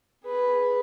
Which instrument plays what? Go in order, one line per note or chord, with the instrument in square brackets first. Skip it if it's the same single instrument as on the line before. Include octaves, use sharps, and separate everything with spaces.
[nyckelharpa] G#4 B4